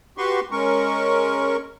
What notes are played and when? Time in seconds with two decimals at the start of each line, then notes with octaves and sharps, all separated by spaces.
0.18 F#4 G4 B4 C6 C#6
0.51 G#3 C#4 A#4 C#6